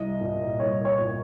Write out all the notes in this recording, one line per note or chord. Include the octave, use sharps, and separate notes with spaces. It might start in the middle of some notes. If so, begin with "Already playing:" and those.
Already playing: C2 D#5
A#2
C2 C#5
C#5
A#2